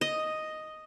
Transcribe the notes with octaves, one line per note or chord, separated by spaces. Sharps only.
D#5